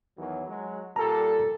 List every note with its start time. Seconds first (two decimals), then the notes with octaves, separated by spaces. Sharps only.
0.17 E2 D#3 F#3
0.47 F#3 G#3
0.96 A#2 G3 A4 A5 A#5